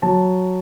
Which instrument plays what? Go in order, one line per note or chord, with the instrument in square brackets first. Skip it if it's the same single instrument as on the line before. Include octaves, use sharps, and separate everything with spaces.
[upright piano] F#3 A5